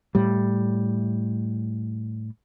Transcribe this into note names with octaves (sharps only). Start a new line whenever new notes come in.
A2 G3